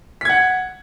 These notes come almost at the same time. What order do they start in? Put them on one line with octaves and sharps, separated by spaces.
B6 G#6 F#5